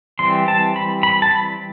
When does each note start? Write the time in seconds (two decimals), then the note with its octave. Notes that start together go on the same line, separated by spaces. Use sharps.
0.19 E3 G3 C4 C6
0.48 A5
0.76 B5
1.03 B5
1.22 A5
1.31 B5